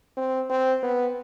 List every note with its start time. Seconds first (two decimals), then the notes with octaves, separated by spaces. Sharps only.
0.17 C4
0.50 C4
0.83 B3